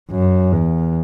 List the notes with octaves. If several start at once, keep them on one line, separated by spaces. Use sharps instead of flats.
F#2
E2